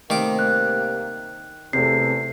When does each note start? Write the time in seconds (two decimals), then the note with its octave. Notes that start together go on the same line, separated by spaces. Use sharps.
0.10 C3 D#3 G3 A3 A#3 D6
0.39 F#6
1.73 E2 C3 A3 C7